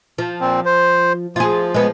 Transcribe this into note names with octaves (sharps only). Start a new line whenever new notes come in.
F3
A#2 C4
C5
F3 F4 G#4
G#3 B3